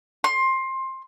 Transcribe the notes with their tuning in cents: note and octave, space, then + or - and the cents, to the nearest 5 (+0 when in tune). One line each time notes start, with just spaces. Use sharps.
C6 +20